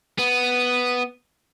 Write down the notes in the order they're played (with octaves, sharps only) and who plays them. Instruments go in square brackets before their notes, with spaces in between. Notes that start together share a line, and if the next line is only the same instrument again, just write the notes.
[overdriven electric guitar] B3